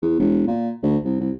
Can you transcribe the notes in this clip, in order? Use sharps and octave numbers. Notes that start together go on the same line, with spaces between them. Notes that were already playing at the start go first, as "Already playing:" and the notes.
E2
E1
A#2
D2
C2
C2